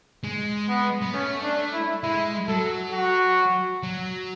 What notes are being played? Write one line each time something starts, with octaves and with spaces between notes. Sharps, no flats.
G#3
B3
B3
A3 C#4
D4
E4
G#3 E4
F#3 A4
F#4
F#3